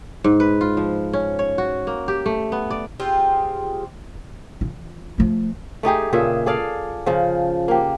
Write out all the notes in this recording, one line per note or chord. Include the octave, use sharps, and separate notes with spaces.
G#2
B4
F4
F3
C#4
C#5
F#4
A#3
G4
A3
B3
D5
C4 F4 G4 G#4
E3 F4
F3 A3
A3 D#4 G4 G#4
A#2 C#3 G#4 E5
G#4 A4 D5 F5
C#3 F3
A#3 G4